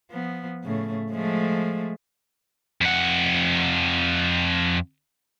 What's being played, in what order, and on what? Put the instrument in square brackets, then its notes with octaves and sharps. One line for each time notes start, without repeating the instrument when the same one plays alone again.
[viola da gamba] F3 B3
A2 C#3 A3
F3 G#3 A3
[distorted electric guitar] F2 F#5